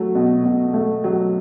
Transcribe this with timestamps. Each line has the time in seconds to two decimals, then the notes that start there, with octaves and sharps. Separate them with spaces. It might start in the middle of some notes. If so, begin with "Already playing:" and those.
Already playing: F#3 A3
0.15 B2
0.45 B2
0.74 A3
1.04 F#3